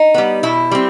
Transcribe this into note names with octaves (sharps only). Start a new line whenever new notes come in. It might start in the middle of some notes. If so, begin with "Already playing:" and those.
Already playing: D#4
G3 B3
B2 E4
G3 C4